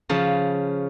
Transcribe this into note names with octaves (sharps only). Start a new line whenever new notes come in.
C#3 F3